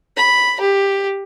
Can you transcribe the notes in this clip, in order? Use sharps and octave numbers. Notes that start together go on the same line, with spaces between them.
B5
G4